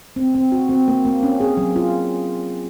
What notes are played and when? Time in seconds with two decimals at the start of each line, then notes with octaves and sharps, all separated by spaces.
0.16 C4
0.35 C4
0.52 F#4
0.69 C4
0.88 A#3
1.05 A#3
1.23 C#4
1.40 G#4
1.57 F#3
1.76 F4